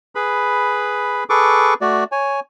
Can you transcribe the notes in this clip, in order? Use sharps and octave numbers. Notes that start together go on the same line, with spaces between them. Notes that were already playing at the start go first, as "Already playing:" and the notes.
G#4 B4 B5
G#4 A4 B4 C#6 D6
A3 F#4 D5
C#5 G#5